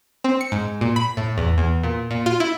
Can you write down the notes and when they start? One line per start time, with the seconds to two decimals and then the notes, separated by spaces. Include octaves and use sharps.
0.24 C4
0.41 C#7
0.52 G#2
0.81 A#2
0.96 B5
1.17 A2
1.38 E2
1.58 E2
1.83 A#2
2.11 A#2
2.26 F4
2.40 E4